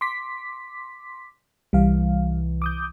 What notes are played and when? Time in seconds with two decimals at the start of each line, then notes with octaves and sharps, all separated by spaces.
0.01 C6 D6 B6
1.73 C2 E3 G3 F5
2.62 D6 D#6 G6